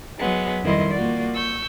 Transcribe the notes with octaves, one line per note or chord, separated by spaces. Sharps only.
F#3 G#3 B3
F2 D#3 G3 E4 D#5 C6
A#3 F4 F#4 D5
C#6 E6 G6